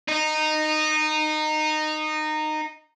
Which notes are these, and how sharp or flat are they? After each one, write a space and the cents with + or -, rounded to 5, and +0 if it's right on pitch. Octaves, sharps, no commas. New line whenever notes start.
D#4 -15